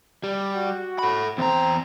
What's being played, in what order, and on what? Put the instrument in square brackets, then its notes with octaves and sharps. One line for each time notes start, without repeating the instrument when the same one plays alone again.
[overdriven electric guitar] G3
[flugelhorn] F#4
[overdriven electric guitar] A4 B5
[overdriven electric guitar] E2 A#5 [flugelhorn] C4